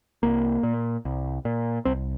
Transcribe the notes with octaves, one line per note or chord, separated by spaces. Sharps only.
C2 A#3
A#2
C2
A#2
C2 C4